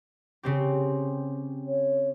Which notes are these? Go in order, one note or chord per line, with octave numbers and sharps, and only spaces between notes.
C#3 C4 G4
C#5